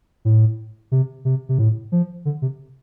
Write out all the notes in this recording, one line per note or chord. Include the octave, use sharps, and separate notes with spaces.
A2
C3
C3
C3
A2
F3
D3
C3